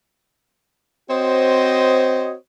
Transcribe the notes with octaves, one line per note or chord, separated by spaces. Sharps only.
C4 F#4 C5 C#5 D#5